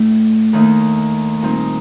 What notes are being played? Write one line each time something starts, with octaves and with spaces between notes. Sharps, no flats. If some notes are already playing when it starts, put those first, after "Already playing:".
Already playing: A2 A3 D4
D#2 D#3 A3 D#4
A#2 G3 C4 D#4